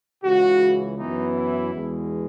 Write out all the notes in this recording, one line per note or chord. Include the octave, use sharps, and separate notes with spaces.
C#2 C#3 E3 F#4
F#2 E3 B3 D#4
E4
E2 B2 G#3